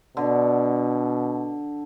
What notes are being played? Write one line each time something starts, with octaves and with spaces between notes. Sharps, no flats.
B2 D3